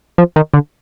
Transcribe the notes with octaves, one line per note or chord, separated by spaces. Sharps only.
F3
D#3
D3